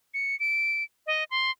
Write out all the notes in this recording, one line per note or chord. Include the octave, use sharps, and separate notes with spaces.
C#7
D7
D#5
C6